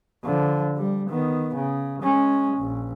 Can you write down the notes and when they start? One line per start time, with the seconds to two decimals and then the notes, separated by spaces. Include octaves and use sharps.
0.24 D3 F3
0.77 G3
1.10 D#3 B3
1.55 C#3
2.02 G#3 C#4
2.57 A#1